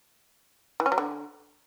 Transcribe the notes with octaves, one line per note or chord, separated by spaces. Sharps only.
E3
C#4
F#3
D3